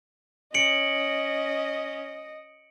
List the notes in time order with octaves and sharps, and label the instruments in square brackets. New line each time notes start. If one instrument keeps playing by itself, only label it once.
[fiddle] C#4 [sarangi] D#5 [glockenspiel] C#7 D7 F#7